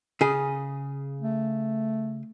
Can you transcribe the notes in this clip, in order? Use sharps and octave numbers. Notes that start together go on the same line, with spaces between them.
C#3 G#4
A3